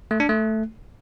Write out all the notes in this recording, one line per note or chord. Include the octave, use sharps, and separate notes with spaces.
A3
D4
A3